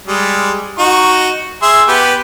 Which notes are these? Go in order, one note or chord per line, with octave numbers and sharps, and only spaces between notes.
G3 G#3
D#4 F#4 C#6
G#4 E5 C6
B3 G4 B4